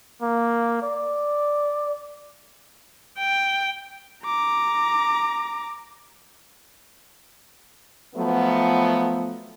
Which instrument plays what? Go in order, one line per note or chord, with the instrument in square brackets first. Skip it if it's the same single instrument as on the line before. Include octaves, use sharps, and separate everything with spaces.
[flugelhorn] A#3
D5
[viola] G5
[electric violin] A#5 D6
[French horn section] F3 F#3 A3 B3